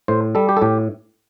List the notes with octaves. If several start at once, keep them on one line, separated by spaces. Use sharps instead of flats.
A2 C5
G3 A4
G4
A4
A2 G4